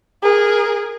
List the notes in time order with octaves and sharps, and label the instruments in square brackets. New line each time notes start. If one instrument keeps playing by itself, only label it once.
[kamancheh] G#4 A#4